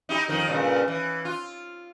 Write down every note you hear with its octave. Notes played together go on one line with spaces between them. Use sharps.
D#4 E4 G4
F2 D#3 D#4
G2 A#2 C#3
E3
F4